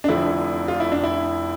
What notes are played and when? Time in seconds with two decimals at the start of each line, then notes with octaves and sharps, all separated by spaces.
0.04 D4
0.08 F1 F2 D3 F3 E4
0.68 F4
0.80 E4
0.92 D4
1.03 E4